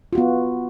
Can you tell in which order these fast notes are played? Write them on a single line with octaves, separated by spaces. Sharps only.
F4 F#4 B3